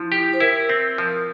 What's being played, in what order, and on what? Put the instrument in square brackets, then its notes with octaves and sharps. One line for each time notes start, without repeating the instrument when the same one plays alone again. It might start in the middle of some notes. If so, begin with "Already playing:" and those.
Already playing: [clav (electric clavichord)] F3 [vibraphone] E4
[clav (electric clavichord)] G4
[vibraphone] C5
[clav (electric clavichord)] E4 [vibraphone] A#4
[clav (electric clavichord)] C4
F3